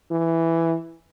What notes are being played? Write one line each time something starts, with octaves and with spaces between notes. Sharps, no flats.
E3